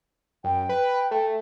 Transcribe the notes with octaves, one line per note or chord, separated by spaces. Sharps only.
F#2 G5
B4
A3